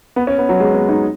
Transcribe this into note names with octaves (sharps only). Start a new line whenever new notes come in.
B3
C#4
B3
F#3
G#3
B3
D#4